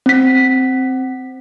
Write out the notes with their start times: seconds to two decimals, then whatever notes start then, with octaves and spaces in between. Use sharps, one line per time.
0.06 C4 B6